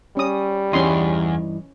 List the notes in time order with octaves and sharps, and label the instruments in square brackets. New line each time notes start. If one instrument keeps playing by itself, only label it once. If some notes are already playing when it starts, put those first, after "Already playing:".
[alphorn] G3 [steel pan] C#4 D#6
[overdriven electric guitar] E2 [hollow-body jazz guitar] G2 E3 D#4 [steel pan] C#4 C6